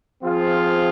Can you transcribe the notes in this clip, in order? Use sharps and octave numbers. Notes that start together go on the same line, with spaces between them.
F3 C4 F4 G#4